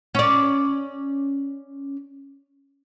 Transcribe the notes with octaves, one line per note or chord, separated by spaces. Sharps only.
C#4 D5